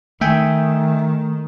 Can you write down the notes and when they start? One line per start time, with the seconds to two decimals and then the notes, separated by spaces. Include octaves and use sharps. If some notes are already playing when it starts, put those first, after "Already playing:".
0.21 D#3 A3 E5 G5 G#5